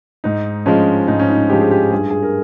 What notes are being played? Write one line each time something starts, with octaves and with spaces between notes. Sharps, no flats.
G#2 D#4
F3 G#3 C#4
G#2 D#4
C#4
D#4
F3 G#3 G4
G#4
G4
G2 G#4
G#4
A#4